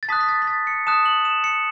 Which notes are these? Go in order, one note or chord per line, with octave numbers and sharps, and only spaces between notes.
A6
A5 D#6 F#6 B6
B6
A6
B6
A6
C#7
A5 D#6 F#6 E7
F#7
E7
C#7